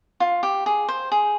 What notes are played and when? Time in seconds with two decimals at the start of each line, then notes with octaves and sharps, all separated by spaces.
0.20 F4
0.43 G4
0.66 G#4
0.88 C5
1.12 G#4